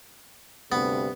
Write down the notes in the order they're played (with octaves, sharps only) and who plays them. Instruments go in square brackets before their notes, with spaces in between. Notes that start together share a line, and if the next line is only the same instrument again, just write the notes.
[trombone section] D2 G2 C3 [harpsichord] B3